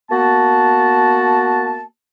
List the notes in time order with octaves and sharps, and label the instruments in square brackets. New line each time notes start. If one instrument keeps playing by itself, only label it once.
[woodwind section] A#3 B3 F#4 A5